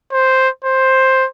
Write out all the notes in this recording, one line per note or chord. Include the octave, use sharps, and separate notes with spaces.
C5
C5